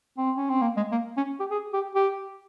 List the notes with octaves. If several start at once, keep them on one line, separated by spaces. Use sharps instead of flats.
C4
C#4
C4
A#3
G#3
A#3
C#4
G4
G#4
G4
G4